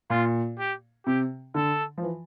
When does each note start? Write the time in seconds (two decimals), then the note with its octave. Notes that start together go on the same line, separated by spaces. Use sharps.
0.10 A#2 F4
0.59 G4
1.06 C3 G4
1.55 D3 A4
1.98 F3
2.03 E3